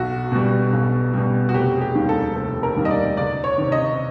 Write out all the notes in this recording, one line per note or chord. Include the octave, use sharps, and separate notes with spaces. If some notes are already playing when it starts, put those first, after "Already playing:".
Already playing: B1 F#4
B2 G3
B1
B2 G3
F#4
F1 G4
G#4
G4
D#2 D#3 G3
A4
F1 A4
A#4
D#2 D#3 G3
D#5
D5
C#2 D5
C#5
C3 D#3
D#5